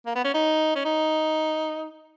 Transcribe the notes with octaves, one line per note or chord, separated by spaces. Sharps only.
A#3
B3
C#4
D#4
C#4
D#4